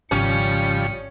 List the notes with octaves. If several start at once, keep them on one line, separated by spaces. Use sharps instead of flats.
G#1 C#3 F3 G3 C#4 D5 C#7